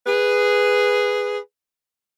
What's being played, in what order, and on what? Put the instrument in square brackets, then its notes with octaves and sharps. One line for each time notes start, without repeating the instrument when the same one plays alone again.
[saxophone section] G#4 B4